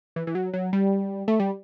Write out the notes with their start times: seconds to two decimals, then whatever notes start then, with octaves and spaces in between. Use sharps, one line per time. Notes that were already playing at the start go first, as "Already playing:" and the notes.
0.16 E3
0.27 E3
0.35 F#3
0.53 F#3
0.73 G3
1.28 A3
1.40 G3